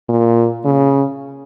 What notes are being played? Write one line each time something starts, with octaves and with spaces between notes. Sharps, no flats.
A#2
C#3